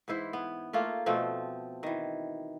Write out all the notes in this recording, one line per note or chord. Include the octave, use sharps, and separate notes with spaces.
G#2 E3 E4 C5
B3
A3 A#3 F4
B2 F3 A3 C4
D#3 E3